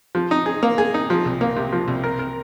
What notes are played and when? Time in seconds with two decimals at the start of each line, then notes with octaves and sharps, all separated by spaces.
0.15 F3
0.31 D#4
0.46 G#4
0.63 A#3
0.78 G#4
0.94 D#4
1.10 F3
1.26 C2
1.41 A#3
1.56 C3
1.72 F3
1.88 C2
2.04 A#4
2.19 A#4